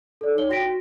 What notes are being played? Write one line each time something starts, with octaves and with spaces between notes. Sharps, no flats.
A4 D5
D#4 C#5 G7
F#4 G5 A#6 B6 D7
F#4